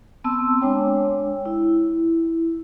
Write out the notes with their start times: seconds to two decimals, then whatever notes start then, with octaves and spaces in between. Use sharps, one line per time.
0.24 B3 C4 A5 C6 E6
0.61 G#3 D4 C#5 G5
1.46 E4